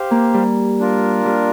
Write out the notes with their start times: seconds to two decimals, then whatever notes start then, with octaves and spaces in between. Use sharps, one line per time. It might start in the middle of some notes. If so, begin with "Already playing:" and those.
Already playing: G4 C5 F5
0.11 A#3
0.34 G3
0.79 D4 F4 A#4
1.25 G3